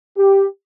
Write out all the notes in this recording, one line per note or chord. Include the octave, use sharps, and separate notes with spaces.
G4